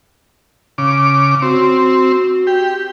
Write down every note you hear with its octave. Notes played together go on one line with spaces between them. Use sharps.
C#3 D6
C4 F#4
G4